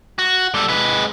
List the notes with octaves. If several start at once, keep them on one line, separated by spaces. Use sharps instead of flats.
F#4
G3 A4
G#3 B4